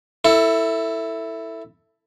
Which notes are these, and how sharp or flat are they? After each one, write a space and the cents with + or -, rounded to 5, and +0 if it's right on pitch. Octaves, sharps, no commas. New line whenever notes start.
E4 +0 A4 +20